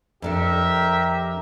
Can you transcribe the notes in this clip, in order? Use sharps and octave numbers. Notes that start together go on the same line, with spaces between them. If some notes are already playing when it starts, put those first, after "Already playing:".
F2 D4 G4 A4 A#4 E5